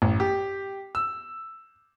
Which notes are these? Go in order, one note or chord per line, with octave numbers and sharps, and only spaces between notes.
A1
G4
E6